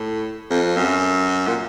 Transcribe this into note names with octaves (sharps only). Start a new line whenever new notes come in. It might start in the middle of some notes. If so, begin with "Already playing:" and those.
Already playing: A2
F2
F#2
A#2